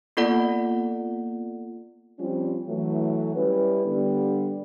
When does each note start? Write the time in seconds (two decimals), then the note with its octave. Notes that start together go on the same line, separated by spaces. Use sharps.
0.17 A#3 B3 F4 A4 D5 F#5
2.19 F3 G3 C4 C#4 F4
2.67 E3 F#3 A3
3.35 G3 C#4 E4 B4
3.85 D3 G3 B3